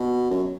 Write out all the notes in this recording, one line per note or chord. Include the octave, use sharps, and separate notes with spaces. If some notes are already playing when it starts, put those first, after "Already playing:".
Already playing: B2
F#2